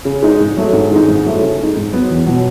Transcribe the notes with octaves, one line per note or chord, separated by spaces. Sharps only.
C#3
G#3 D#4
G#2
F#3 A3
G#2
D#3 G#3 D#4
G#2
F#3 A3 E4
C#3
G#3 D#4
G#2
F#3 B3
E2
B2 F#3 B3